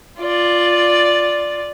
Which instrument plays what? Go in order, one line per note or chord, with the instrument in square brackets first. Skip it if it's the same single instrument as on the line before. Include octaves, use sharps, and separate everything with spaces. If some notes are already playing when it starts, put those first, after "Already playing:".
[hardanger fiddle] F4 D5